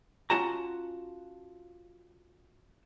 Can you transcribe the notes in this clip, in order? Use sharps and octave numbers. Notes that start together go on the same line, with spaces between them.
C#4 F4 F#4 A5 A#5